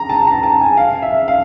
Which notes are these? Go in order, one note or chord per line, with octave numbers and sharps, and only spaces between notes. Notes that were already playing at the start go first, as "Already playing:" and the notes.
Already playing: A#5
A5
A#5
A5
G#5
F5
E5
F5